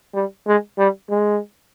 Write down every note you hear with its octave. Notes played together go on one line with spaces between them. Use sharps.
G3
G#3
G3
G#3